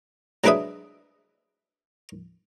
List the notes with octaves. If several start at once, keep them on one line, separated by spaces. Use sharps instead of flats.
F#3 G#3 D4 B4 E5 D#6